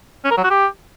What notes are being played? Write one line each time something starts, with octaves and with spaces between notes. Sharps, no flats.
C#4
A#4
F#3
F#4
G4